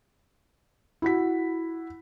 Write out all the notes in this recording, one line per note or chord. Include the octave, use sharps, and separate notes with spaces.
E4 F#4 B6